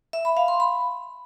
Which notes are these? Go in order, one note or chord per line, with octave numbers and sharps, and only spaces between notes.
E5
B5
F5
C6
B5